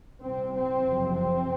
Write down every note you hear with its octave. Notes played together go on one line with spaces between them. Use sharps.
C2 C3 C4
C4
F#1 F2 C3
C4